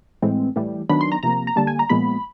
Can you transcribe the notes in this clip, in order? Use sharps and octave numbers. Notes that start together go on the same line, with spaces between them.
A2 E3 G#3 C4
A2 E3 G3
D#3 F#3 B3 D4 B5
C6
A#5
C3 F3 A#3 A#5
A#5
D3 G3 A#3 A5
G#5
A#5
A#2 F3 G#3 B3 B5